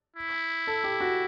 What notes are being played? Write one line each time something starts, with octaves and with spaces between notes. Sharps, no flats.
E4
A4
G4
F#4